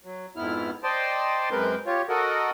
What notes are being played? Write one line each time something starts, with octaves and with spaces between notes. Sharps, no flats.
F#3
F2 G#2 B3 E4 F6
C5 D5 D#5 G5 A5 C6
F#2 G#3 C4 A#4 B4 G6
F4 G4 C#5
F#4 A4 A#4 D#5 F#5